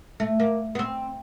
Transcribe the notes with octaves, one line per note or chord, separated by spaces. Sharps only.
A3
A#3
B3
C4